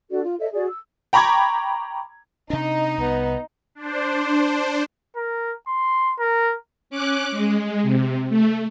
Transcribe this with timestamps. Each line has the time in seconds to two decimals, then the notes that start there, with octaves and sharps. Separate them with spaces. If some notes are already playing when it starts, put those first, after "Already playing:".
0.10 D4 F#4 A4 D5
0.23 F4
0.39 A4 C#5 D#5 E5
0.52 F#4 G#4 D5
0.67 E6
1.13 G5 A#5 B5 C#6 D6 G#6
2.50 C3 D4 D#4
2.98 C2 B3
3.75 D4 C5
5.16 A#4
5.68 C6
6.19 A#4
6.90 C#4 D6 F#6
7.31 G#3
7.82 C3
8.29 A3